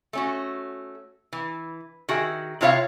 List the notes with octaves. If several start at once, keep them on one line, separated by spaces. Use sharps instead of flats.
A3 C#4 F#4
E3
D#3 F#4 G#4 E5
C3 E4 F4 C#5 E5 F5